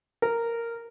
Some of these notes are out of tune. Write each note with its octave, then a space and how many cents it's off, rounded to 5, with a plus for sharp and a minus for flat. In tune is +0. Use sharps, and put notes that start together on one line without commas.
A#4 -5